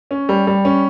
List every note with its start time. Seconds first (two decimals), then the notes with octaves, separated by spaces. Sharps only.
0.11 C#4
0.29 G3
0.47 G3
0.65 C#4